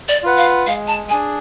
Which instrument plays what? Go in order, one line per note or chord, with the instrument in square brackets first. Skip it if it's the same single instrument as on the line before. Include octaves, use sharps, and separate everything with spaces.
[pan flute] D5
[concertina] F4 B4 F#5
[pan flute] F5
[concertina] G#3 [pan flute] F5
[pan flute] A5
[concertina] D4 G#4 [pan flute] G#5